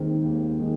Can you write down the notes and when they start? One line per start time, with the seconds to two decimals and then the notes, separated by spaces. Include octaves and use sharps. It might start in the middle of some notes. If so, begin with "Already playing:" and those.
Already playing: D#2 D#3 G#3 C4
0.24 D#2
0.59 D#3 G#3